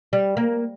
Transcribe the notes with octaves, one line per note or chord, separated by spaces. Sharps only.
G3
A#3